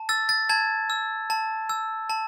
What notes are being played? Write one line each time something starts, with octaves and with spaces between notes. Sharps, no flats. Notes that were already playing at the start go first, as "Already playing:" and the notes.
Already playing: A5
E6 A6
A6
A5 G#6
E6
A5
E6
A5